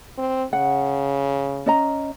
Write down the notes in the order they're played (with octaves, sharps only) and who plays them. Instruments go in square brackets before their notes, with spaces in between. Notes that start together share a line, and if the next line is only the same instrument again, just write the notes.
[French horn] C4
[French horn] C#3 [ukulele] F#5
[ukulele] C#4 D#5 A#5